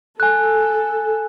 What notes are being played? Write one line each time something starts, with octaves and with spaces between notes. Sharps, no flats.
A4 G#5 F#6